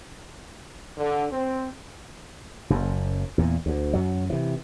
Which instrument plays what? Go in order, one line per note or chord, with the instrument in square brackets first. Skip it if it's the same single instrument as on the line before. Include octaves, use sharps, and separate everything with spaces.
[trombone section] D3
C4
[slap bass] F#1 F#2
E2 A#2
D2
F#2 F#3
C3 E3